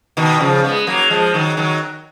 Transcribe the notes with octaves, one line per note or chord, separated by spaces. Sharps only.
B2 D#3
C#3 F3
G#3 B3
F#3 A#3
F3 G#3
D#3 F#3
D#3 F#3